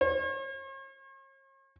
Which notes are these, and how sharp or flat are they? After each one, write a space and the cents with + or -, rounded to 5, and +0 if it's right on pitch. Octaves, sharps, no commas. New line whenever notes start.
C#5 -45